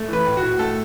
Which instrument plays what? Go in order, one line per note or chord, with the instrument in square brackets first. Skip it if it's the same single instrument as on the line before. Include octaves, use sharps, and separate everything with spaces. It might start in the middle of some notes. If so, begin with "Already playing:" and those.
Already playing: [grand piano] A3
E3 B4
A2
F#4
A2
A3 A4